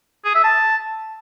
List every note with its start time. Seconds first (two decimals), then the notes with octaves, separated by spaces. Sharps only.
0.25 G#4
0.34 E5
0.44 A5